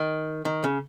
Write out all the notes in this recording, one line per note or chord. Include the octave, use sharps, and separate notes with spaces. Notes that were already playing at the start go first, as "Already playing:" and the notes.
Already playing: D#3
D#3
C#3